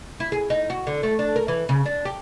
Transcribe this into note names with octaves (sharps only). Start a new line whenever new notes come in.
E4
G#4
D#4
F#4
D3
A3
D4
A#4
E3
C#3
D4
G4